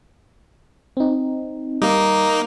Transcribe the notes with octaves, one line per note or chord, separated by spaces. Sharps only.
C4 D#4
G3 A#3 D#4 D6